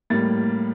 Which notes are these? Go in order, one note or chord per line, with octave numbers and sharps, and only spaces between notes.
A2 G3 A#3 A6